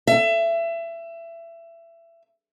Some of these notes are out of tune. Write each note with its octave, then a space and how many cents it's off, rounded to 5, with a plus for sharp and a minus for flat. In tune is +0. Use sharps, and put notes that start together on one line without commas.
E5 +25